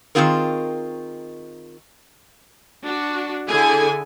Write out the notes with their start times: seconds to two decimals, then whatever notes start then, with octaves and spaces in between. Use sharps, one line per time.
0.15 D#3 G#3 C4 F4 G#4 A#4
2.84 D4 F#4
3.49 D3 E4 G#4 A4 G#5